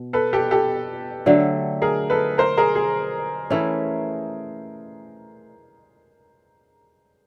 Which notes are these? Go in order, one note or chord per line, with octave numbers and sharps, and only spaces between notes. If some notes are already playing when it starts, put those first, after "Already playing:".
Already playing: B2
A4 B4
G4 A4
G4 A4
D3 F#3 A3
G#4 A#4
A4 B4
A#4 C5
G#4 A#4
G#4
E3 A3 C#4